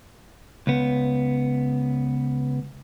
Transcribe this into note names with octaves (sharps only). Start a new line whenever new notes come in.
C#2 B3